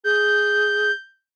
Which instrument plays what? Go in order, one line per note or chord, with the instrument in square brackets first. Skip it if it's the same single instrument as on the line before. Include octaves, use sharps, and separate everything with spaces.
[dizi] G#4 [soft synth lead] G6